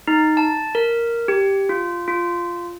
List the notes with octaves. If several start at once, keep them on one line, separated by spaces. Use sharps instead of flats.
D#4
A5
A#4
G4
F4
F4